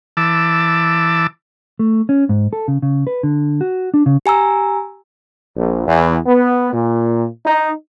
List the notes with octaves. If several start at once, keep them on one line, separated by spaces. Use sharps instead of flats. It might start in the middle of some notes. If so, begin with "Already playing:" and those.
E3 A5 D6 E6
A3
C#4
G#2
A4
C#3
C#3
B4
D3
F#4
D4
C#3
G4 G#5 A#5 E6
A#1
E2
B3
A#2
D#4